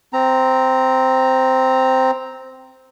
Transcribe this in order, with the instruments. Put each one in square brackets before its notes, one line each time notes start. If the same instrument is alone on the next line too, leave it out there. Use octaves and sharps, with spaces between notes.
[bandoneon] C4 A#5